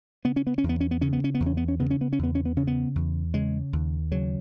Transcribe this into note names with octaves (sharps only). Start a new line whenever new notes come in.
C#3 B3
C#4
B3
C#4
E2
B3
C#4
B3
C#3 C#4
B3
C#4
B3
E2
C#4
B3
C#4
C#3 B3
C#4
B3
C#4
E2 B3
C#4
B3
C#3 C#4
B3
E2
C#3 G#3
D#2
C#3 F#3